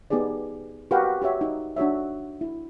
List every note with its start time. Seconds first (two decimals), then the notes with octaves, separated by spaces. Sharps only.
0.10 B3 D#4 G4 G#4 D5
0.91 F#4 G4 A#4 B4 F5 G5
1.22 F#4 G4 C#5 E5
1.41 D#4
1.76 D4 F#4 C#5 E5
2.41 E4